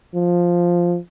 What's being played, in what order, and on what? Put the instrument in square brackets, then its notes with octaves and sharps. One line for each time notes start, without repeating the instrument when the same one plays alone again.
[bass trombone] F3